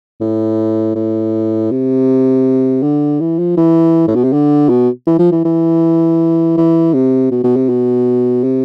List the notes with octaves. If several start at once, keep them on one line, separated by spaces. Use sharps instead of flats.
A2
A2
C3
D3
E3
F3
E3
A2
B2
C3
D3
B2
E3
F3
E3
E3
E3
C3
B2
B2
C3
B2
C3